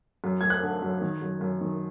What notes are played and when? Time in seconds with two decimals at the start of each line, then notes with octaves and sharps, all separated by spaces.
0.24 F#2
0.41 F#2 G#6
0.50 F#6
0.63 D3
0.82 F#2
1.01 D#3
1.22 F#2
1.41 F#2
1.61 D#3